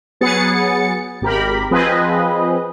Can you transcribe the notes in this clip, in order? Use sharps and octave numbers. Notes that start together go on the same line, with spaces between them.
F#3 B3 G#4 A6 C#7
G#1 G4 A#4 B5
F3 C4 G#4 B4 D#5